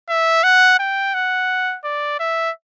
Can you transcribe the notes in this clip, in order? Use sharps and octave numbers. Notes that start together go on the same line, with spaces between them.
E5
F#5
G5
F#5
D5
E5